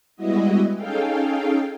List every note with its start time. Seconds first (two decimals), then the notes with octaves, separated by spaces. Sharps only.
0.16 G3 G#3 B3 E4 F#4 D#5
0.77 C#4 D#4 G#4 A4 F5 G5